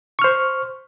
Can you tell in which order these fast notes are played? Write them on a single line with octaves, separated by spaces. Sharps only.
C#6 F6 C5